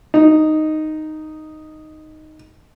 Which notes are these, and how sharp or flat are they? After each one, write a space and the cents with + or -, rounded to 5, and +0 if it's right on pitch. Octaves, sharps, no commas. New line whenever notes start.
D#4 -5